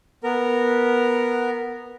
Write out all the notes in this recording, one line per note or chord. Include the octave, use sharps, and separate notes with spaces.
B3 A#4